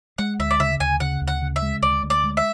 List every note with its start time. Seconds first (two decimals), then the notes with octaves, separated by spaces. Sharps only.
0.18 G#3 F#5
0.39 D2 E5
0.51 D5
0.59 C#3 E5
0.80 D2 G#5
1.00 C#3 F#5
1.22 D2
1.28 F#5
1.42 C#3
1.56 E5
1.62 G#3
1.82 D2 D5
2.03 D2
2.10 D5
2.24 G#3
2.37 E5